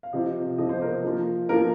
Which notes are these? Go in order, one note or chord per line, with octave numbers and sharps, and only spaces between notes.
F5
C3 F3 C4 F4 D#5
C3 F3 C4 F4 D#5
C5
A#4
F3 A#3 F4
F3 A#3 F4 A#4